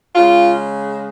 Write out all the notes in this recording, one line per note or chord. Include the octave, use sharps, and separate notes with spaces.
C#3 G#3 F4